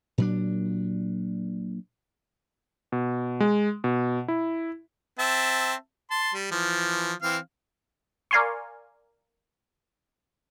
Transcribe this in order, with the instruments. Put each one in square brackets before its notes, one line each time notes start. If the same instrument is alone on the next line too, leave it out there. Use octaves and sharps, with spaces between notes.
[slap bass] A#2 F#3 D4
[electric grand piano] B2
G#3
B2
E4
[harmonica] C4 E5 A5
A5 C6
G3
E3 F3
E3 C4 F5
[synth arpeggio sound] A#4 D5 F5 G#5 C6 C#6